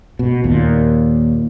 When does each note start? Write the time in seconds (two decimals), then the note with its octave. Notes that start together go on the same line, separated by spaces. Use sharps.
0.19 B2
0.44 D#2 A#2